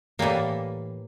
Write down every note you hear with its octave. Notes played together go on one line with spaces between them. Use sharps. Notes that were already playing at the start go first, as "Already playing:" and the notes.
A2 E3 G3 A#3